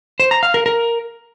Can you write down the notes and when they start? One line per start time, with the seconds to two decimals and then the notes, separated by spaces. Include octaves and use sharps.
0.20 C5
0.31 A#5
0.43 F5
0.54 A#4
0.66 A#4